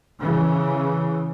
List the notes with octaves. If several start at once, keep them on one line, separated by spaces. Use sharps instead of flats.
C#3 E3